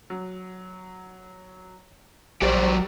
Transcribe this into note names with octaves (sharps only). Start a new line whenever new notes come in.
F#3
A#1 F#3 G3 G4 A#4 C5 D5